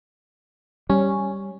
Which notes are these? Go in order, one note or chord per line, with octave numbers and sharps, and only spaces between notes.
G3 C#4